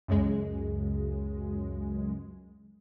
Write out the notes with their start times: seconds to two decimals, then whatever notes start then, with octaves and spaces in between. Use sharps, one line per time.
0.08 C#2 F#2 C#3 G#3